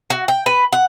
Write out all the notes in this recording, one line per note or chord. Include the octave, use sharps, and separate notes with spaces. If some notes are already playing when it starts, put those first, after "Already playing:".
F#4
G5
B4
F#5